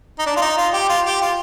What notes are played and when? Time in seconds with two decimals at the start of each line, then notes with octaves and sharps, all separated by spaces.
0.19 D#4
0.27 D4
0.37 F4
0.42 D#4
0.57 F4
0.74 G4
0.89 F4
1.05 G4
1.21 F4